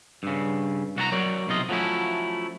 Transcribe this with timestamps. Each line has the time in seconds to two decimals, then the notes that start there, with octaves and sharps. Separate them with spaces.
0.23 G2 C#3
0.96 C2 F#4 A4 A#5
1.12 F#3 A#4 C#5 D5
1.48 B1 C3 F4 D#5
1.69 F3 F#3 A3 C#4 E4